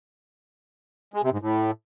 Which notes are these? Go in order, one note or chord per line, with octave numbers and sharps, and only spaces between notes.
G#3
C3
G#2
A2